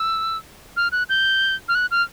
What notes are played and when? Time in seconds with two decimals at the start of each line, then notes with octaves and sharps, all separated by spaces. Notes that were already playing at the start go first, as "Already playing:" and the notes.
Already playing: E6
0.77 F6
0.92 F#6
1.09 G6
1.69 F6
1.75 F#6
1.91 F6